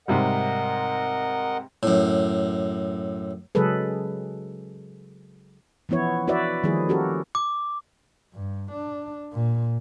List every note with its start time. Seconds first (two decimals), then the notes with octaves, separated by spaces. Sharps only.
0.08 G#2 C3 G3 A#4 D#5 F#5
1.83 F#2 A2
3.55 C#3 F#3 G#3 G#4 A4 B4
5.89 E3 F3 B3 E4 C#5
6.27 E4 F#4 B4 C#5 D5 E5
6.63 D#3 F3 G3 A#3 E4 G#4
6.89 C#4 F#4 G4 A4 A#4
7.35 D6
8.33 G2
8.72 D4
9.32 A#2